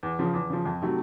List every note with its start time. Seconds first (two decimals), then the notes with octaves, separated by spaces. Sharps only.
0.03 E2
0.19 C#3 F3
0.34 E2
0.50 C#3 F3
0.66 F2
0.82 C3 D#3 F#3 A3